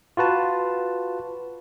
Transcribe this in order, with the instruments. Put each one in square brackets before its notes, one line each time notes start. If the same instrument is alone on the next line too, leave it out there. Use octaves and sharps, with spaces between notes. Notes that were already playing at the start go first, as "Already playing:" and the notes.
[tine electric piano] F4 F#4 B4 A5